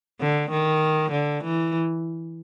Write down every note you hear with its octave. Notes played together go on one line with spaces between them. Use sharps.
D3
D#3
D3
E3